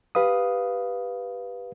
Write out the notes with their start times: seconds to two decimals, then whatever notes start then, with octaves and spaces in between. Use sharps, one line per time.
0.15 G4 B4 F5 D#6